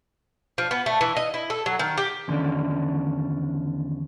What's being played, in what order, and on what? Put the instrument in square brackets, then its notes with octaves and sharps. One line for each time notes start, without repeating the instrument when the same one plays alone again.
[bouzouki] F3
B3
A3
E3
D#5
E4
A4
F#3
D#3
G4
[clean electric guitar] E2 D3 D#3 C#4 D4